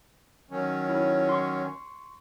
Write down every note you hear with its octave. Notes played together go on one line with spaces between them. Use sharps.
D#3 F#3 C#4
E4
C6 C#6